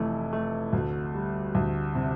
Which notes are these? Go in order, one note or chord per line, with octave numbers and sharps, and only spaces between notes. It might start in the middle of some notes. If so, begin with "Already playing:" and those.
Already playing: F1 E3 A3
A3
D2
G3
D2
C3